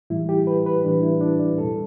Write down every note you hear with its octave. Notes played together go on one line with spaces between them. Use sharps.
A2 E3 G3 E4
G4
B4
B4
A2 E3 G3 D4
E4
D4
D5
E2 B2 G3 A4